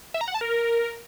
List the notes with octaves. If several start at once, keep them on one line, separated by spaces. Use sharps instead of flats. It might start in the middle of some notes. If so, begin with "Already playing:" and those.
E5
A#5
F#5
A5
A#4